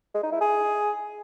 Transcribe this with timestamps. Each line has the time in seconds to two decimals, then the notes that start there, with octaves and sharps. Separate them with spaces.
0.15 G#3
0.23 D#4
0.32 E4
0.41 G#4